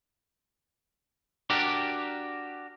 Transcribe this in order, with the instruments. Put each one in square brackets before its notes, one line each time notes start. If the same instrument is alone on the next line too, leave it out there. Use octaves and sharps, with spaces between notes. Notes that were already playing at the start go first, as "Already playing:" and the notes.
[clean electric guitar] D4 F#4 G4 A#4 D5